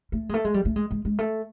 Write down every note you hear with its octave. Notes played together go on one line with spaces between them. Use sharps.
A3
G#3
A3
G#3
G3
A3
G#3
G#3
G#3
A3